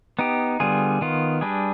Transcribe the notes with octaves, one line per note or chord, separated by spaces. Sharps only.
B3 D#4 G4
D3 G3 B3 F4 G#4
D#3 B3 F4
G3 D4 G#4 B4